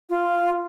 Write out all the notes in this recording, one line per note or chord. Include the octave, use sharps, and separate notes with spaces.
F4